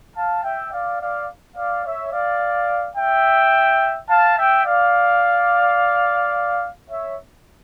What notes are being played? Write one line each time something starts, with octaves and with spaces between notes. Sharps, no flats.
F5 A5
E5 G5
D5 F5
D5 F5
D5 F5
C#5 E5
D5 F5
E5 G5
F5 A5
E5 G5
D5 F5
C#5 E5